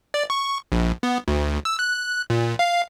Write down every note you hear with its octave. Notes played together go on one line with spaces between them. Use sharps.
D5
C#6
A#1
B3
D2
E6
F#6
A#2
F5